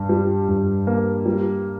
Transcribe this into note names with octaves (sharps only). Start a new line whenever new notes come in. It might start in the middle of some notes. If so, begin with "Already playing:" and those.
Already playing: G2
G3
G2
A#3
G3